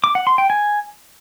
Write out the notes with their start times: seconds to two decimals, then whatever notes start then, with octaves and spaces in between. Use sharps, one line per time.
0.04 D6
0.15 F#5
0.27 C6
0.38 G5
0.50 G#5